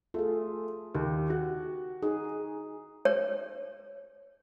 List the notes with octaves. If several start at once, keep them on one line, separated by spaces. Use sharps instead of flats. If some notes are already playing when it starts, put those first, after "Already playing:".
A3 F4 G#4
D#2 G4
F#4
D#4 G#4
C#5